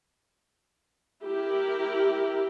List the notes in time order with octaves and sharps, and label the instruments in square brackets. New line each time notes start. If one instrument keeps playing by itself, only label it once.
[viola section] E4 G4 A#4